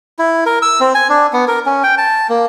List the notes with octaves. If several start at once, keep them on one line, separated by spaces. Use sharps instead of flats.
E4
A#4
E6
C4
G#5
D4
B3
A#4
C#4
G5
A5
A#3